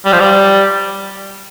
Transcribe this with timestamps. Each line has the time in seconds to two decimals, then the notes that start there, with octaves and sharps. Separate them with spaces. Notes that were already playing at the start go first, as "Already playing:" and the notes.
0.05 G3
0.13 F3
0.20 G3